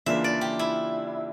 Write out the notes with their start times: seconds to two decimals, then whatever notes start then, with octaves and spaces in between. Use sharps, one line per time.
0.06 C#3 E3 A#3 D4 F4 E5
0.24 D5
0.41 G4
0.59 E4